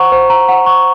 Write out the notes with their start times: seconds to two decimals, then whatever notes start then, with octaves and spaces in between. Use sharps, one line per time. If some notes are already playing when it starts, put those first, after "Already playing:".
Already playing: C5 F#5 A#5 C#6
0.12 C5
0.30 A#5
0.49 F#5
0.66 C#6